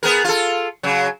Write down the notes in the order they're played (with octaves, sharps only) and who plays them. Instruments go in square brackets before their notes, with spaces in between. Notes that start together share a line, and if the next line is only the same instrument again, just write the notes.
[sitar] B3 G#4 A#4
F4 A4
C#3 F#3